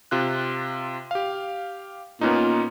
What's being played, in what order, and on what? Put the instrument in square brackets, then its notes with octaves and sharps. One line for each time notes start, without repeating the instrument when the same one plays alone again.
[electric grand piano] C3 F4 F#6
G4 F5
[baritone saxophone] A#2 [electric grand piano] B3 C#4 D#4